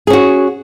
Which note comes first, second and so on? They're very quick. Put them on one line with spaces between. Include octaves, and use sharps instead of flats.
G#4 C#4 F#4